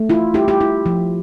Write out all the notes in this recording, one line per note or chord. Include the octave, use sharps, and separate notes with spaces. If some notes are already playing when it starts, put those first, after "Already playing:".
Already playing: A3
E4 F4
E4 G4
G4
E4
F3